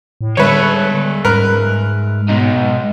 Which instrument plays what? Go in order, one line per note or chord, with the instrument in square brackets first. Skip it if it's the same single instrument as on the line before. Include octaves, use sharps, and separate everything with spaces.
[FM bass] A2
[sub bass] D3 [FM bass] G3 [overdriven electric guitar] G#3 E5 [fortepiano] B4 C#5
[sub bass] G#2 [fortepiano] A#4 B4
[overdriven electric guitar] B2 D#4 [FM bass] G#3